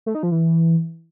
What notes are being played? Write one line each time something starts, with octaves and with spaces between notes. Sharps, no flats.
A3
D#4
F3
E3